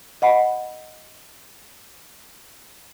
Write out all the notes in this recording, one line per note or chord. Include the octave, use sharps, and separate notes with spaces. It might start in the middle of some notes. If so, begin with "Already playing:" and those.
D#5 F#5 B5